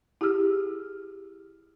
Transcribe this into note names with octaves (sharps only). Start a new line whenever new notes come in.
E4 G4 G#4 E6 F6